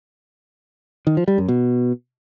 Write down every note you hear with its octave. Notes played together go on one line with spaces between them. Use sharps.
D#3
F3
G3
F#2
B2